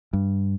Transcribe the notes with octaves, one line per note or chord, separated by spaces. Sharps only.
G2